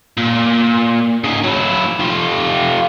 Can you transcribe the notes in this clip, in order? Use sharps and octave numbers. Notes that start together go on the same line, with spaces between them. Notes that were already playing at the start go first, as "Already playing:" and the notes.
A#2
C#3 D#4
F#3 E4
F4 G4